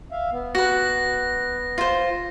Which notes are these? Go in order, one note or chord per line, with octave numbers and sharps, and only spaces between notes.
E5 F5
B3
F#4 B4 A#6
F4 C5